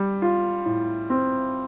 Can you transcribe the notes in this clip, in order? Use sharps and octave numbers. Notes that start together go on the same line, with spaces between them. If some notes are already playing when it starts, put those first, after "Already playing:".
Already playing: G3
F4
A2
C4